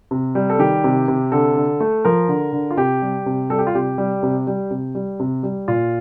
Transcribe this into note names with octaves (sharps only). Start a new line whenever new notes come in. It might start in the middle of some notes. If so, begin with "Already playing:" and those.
C3
G3
A4
D#3 G4
C3
C3
D3 A4
D3
A3
F3 A#4
D3
D3
F4
C3 G4
G3
C3
G3 A4
G4
F4
C3 G4
G3
C3
G3
C3
G3
C3
G3
A#2 F4